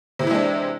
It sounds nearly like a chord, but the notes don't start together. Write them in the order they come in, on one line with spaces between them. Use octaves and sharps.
C3 E3 E4 G#3 D4